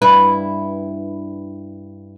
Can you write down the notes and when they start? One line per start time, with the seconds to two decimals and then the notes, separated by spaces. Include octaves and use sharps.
0.02 G2 E4 B4